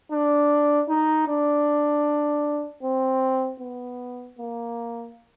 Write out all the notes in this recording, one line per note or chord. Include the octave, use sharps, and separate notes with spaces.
D4
D#4
D4
C4
B3
A#3